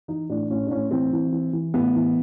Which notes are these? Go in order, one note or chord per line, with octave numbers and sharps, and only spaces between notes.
E3 D#4
A2 D4
A2 C#4
D4
A2 C#4
E3 C4
E3
E3
E3
A2 B3
E3